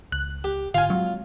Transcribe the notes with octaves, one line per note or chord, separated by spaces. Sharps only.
C#2 F#6
G4
F#1 G#2 D3 F4 F5 G#5
F#3 G#3 A#3 C4